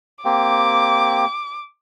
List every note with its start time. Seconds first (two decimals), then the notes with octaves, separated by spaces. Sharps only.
0.25 A#3 C4 G4 D6